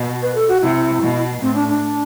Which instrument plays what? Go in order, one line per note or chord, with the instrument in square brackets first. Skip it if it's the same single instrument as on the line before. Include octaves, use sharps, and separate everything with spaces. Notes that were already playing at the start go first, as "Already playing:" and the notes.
Already playing: [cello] B2
[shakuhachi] B4
A4
F#4
[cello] C3 [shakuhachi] E4
[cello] B2
[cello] A2 [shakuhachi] C4
[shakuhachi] D4
D4